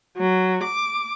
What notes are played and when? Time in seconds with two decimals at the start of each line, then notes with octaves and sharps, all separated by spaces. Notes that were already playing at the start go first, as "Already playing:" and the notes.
0.17 F#3
0.63 D6